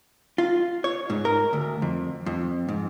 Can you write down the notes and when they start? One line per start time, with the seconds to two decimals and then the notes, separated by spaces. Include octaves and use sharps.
0.38 F4
0.84 C#5
1.10 G#2
1.25 A#4
1.53 D2
1.82 F2
2.26 F2
2.69 G#2